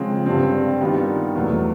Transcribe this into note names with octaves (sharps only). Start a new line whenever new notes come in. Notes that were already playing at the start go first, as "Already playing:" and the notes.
Already playing: C#3 F3 G#3 C4
G2 D3 G3 C4
D#3 G3 B3 D4 F4
E2 B2 F#3 A3